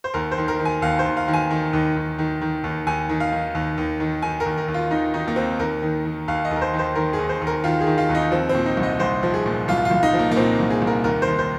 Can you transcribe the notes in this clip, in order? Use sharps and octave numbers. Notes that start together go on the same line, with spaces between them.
C5
D#2 A#4
C5
D#3
A#4
D#3
G#5
D#2 F5
C5
D#2
F5
D#3
G#5
D#3
D#2
D#2
D#3
D#3
D#2
D#2 G#5
D#3
F5
D#3
D#2
D#2
D#3
D#3 G#5
A#4
D#2
A#4
D#2
F4
D#3 D#4
D#3 D#4
A#3
D#2 C4
D#2 A#4
D#3
D#3
D#2 F5
D#5
D#2
A#4
C5
D#3
C5
D#3 A#4
G#4
D#2
C5
D#2
A#4
D#3 F4
G#4
D#3
F4
D#2
D#4
F3 C4
C4
A#2
D#4
C2
D#5
C2 C5
F3
G#4
A#2
C2 F4
F4
C2
D#4
F3
A#3
A#3
A#2 C4
C2
G#4
C2
A#4
D#2 A#4
C5
D#3
C5